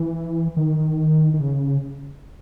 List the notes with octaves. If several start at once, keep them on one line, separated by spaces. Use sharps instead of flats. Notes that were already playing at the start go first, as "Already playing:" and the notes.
Already playing: E3
D#3
D#3
C#3